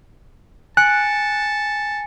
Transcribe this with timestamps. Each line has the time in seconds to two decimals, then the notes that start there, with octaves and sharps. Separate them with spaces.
0.77 G#5 A5 F#6 C#7